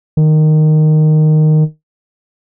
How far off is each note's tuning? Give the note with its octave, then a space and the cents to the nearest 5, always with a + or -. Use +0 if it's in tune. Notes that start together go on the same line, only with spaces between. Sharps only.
D#3 -10